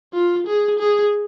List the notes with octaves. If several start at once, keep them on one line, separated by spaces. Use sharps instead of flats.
F4
G#4
G#4